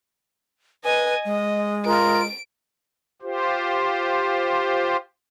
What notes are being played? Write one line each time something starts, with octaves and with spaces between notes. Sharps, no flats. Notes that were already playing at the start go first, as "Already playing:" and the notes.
B4 D#5 G#5
G#3 D#5
F4 A#4 D7
F4 G4 C5